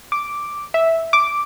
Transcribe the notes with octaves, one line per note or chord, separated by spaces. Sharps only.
D6
E5
D6